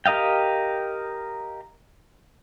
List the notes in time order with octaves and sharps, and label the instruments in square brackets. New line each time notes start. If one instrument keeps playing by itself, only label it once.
[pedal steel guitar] G4 A#4 D#5 F5 G5